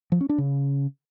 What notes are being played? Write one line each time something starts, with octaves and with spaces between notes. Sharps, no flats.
F3
C#4
D4
C#3